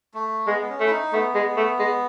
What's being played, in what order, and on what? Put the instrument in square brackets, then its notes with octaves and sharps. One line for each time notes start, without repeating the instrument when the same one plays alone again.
[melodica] A3
[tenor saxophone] G#3 [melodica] B3
[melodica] B3
C#4
[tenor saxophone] A3
[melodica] E4
D#4
[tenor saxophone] A3 [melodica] B3
[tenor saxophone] G#3
A3
G#3